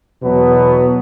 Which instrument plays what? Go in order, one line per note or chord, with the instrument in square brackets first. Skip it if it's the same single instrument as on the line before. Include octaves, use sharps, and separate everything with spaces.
[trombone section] E2 B2 F#3 B3